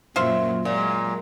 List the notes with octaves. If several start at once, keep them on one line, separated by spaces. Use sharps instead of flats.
F#2 A#2 F#3 F4 C5 E5
A#2 F#3 G#3